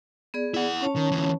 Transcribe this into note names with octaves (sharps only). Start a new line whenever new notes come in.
B3 G#4 D5
E4 F#5
C#4 C#5 A5
D#3
D2 E3